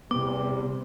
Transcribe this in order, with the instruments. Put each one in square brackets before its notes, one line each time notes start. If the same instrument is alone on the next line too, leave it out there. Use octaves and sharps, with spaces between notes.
[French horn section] E2 G3 [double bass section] C3 [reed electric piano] B3 [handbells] D6